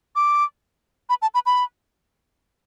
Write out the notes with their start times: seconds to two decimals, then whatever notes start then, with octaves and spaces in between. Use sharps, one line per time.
0.16 D6
1.09 B5
1.22 A5
1.34 B5
1.46 B5